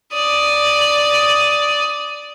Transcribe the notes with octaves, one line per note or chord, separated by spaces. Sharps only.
D5 D#6